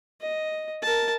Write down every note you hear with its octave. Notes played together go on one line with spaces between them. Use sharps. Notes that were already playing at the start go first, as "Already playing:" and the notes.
D#5
A#4 A5